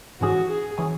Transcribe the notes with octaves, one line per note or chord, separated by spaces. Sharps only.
G#1 G#2 E3 C#4 F#4 G#4
G#4
E3 C#4 G#4